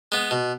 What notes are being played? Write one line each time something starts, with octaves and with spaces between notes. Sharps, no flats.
G#3 B3
B2